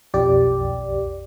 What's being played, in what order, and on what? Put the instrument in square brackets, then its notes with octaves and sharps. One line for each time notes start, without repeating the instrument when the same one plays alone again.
[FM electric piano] B1 F2 G4 D5